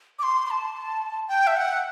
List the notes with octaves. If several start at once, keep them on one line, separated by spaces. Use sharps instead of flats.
D6
C6
C6
A5
G5
E5
F#5